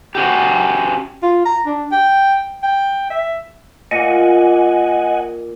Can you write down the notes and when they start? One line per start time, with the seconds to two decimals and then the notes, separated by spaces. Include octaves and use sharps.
0.15 C#4 F#4 G4
1.23 F4
1.46 A#5
1.66 D4
1.92 G5
2.63 G5
3.10 E5
3.91 A#2 D#5 F#5 G#5